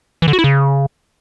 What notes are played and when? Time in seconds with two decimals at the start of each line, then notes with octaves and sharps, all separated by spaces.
0.22 E3
0.28 D3
0.33 F#4
0.39 E4
0.44 C#3